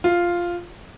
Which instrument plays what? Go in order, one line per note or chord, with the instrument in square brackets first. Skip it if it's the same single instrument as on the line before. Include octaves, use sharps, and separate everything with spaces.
[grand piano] F4